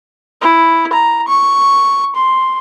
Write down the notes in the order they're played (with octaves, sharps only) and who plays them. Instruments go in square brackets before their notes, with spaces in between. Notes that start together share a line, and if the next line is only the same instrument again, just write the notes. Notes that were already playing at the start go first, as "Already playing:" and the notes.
[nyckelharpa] E4
A#5
C#6
C6